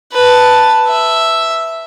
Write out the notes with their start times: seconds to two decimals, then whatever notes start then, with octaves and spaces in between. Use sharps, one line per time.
0.12 B4 A5
0.88 E5